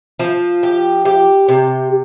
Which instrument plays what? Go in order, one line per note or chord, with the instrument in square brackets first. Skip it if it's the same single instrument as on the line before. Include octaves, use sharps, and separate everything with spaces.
[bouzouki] F3
G4
G4
C3